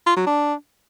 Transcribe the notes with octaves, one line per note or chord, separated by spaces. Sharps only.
F4
F#3
D4